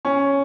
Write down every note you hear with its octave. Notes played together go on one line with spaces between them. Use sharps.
C#4